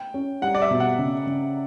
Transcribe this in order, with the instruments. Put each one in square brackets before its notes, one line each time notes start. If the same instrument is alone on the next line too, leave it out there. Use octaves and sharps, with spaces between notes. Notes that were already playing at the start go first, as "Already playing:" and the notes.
Already playing: [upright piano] G5
[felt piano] C#4
[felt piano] G3 [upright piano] F#5
[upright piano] D5
E5
[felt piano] B2
[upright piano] F#5
[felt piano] C#3
C#3